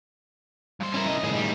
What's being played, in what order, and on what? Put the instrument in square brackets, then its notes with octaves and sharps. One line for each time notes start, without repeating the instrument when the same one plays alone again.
[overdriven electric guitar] G2 C5
[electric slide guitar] C#4 E4 A#4
[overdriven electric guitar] C2 D#5
[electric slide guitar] A2 D#3 G#4
[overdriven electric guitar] G3